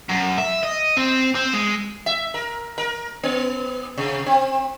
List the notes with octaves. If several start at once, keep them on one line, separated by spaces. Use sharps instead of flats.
F#2
E5
D#5
C4
C4
G#3
E5
A#4
A#4
B3
C3
C4